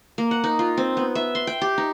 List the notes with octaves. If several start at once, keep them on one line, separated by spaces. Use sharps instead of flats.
A#3
F#5
D#4
F4
C4
B3
E5
C6
G5
G4
D#4